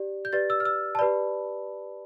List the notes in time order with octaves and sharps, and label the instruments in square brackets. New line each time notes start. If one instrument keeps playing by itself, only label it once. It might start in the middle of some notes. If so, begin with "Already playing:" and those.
Already playing: [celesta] G4 D5
G6
G4 B4 D5 A6
E6
F6
E6
A5
G4 B4 D5 B5